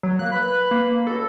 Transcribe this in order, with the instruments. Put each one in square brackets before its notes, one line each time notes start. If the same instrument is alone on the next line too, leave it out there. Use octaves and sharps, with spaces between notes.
[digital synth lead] F#3
[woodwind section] A#3 [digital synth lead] F#6
[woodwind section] B4 B5
[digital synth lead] A#3
[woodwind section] C#2 F#4 [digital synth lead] A4